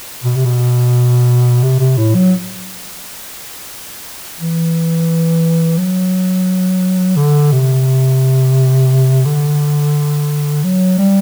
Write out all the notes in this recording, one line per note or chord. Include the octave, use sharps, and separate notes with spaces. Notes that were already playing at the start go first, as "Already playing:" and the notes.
B2
C3
B2
C3
C3
A2
F#3
E3
F#3
D3
C3
D3
F#3
G3